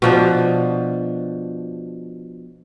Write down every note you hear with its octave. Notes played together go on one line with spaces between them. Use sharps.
B2 F3 D4